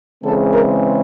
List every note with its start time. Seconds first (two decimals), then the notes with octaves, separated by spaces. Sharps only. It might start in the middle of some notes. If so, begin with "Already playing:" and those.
0.24 C#3 E3 G#3 C4 A4
0.53 A#4